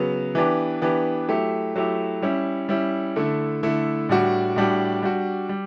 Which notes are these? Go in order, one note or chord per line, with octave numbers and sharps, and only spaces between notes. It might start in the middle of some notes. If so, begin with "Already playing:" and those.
Already playing: C#3 F#3 B3
E3 B3 D4 G4
E3 B3 D4 G4
F#3 A3 E4 G4
F#3 A3 E4 G4
G3 C#4 E4
G3 C#4 E4
D3 A3 E4
D3 A3 E4
A2 G3 D4 F#4
A2 G3 D4 F#4
G3 D4 F#4
G3